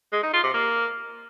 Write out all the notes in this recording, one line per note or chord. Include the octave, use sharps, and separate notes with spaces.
G#3
D#4
F4
C3
A#3